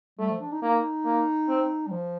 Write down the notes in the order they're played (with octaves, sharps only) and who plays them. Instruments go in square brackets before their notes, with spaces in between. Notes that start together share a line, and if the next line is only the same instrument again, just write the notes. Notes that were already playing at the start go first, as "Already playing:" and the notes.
[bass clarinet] G3 [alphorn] A3
[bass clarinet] F3
D4
D#4
[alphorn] A#3 [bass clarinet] D#4
[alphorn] A#3
C4
[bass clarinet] G3
F3